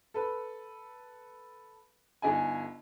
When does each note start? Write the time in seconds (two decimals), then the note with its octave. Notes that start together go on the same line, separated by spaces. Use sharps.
0.14 A4 B4
2.22 G1 D4 D#4 G#5